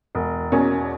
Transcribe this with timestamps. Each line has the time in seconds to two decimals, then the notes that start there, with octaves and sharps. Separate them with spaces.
0.15 E1
0.52 E2 B2 A#3 C#4